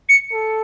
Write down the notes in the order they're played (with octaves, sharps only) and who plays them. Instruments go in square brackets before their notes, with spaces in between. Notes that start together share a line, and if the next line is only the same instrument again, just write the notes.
[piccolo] C#7
[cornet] A4